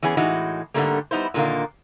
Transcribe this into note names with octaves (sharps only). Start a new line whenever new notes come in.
E3 B3 C#4 G#4
A2 E3 G#3 D#4 F#4
G#2 D3 F3 G3 A3 A#3
G3 B3 D#4 E4 C5
A#2 D3 D#3 A#3